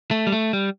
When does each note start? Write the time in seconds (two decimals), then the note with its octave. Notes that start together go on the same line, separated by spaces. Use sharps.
0.11 A3
0.27 G3
0.32 A3
0.53 G3